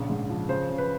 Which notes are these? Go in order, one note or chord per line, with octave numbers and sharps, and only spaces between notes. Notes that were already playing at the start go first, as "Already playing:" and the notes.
Already playing: A#1 C#3
G#2
F3
C#3 C5
C#3
B4